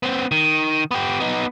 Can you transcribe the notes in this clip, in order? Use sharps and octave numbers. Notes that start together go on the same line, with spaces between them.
B3 C4
D#3
B3 G4
B3 D#4